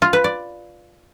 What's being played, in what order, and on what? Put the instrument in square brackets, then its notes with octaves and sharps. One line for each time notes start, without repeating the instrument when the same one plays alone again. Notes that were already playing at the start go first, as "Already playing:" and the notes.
[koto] F4
B4
D5